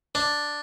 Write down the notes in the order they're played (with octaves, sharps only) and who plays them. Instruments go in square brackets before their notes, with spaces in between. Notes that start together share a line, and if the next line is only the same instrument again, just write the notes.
[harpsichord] D4